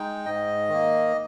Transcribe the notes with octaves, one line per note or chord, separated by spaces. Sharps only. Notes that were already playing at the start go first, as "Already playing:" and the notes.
Already playing: G#3 D#4 G5
G#2 D#5
D#3 A#3